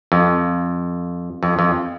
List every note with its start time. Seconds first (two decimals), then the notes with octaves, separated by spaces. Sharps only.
0.12 F2
1.43 F2
1.59 F2